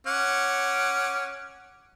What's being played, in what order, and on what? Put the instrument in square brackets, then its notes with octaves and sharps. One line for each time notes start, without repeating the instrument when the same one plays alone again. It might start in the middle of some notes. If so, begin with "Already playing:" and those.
[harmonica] C#4 F#5 D6